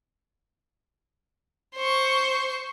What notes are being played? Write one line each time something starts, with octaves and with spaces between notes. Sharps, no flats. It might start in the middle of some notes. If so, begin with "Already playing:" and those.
C5 C#6